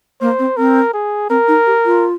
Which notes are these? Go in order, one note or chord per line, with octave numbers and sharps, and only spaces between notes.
A#3 C5
C4
C4 A#4
G#4
C4 A#4
D#4
G4
F4